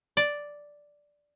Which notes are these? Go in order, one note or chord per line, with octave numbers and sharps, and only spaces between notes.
D5